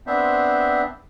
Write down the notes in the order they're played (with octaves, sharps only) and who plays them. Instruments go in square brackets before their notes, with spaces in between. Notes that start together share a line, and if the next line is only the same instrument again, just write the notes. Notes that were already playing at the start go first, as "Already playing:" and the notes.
[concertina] B3 C4 D4 C5 E5